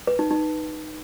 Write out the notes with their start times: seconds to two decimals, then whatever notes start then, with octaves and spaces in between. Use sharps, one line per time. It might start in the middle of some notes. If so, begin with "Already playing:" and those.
0.07 B4
0.19 D#4
0.31 D#4